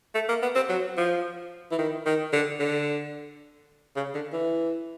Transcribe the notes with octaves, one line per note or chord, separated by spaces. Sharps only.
A3
A#3
B3
C4
F#3
F3
E3
D#3
D#3
D3
D3
C#3
D3
E3